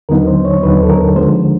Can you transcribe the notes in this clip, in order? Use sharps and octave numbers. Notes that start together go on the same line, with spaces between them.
D#2 D3 F#3 B3 D#4 A#4
C5
C#5
D#2 D3 F#3 B3 D#4 B4
A4
A#4
D3 F3 G#3 C5